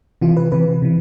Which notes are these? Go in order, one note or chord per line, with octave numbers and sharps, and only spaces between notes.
C3 E3 F4
B4
C3 E3 B4
C3 E3